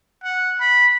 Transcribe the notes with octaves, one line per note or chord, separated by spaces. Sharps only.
F#5
B5